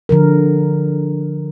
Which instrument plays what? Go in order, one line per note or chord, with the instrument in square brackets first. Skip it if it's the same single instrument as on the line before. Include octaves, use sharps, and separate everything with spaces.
[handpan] D3 F3 A#4